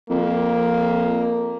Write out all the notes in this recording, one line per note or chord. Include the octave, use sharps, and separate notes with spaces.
F2 A#3